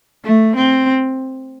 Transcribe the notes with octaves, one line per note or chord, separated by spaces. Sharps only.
A3
C4